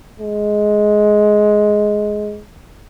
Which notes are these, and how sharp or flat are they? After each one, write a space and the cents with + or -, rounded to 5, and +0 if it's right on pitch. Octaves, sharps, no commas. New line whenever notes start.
G#3 +10